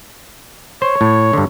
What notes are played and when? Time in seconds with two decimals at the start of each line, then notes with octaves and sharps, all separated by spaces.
0.82 C5 C#5
1.01 A2
1.33 G2 D3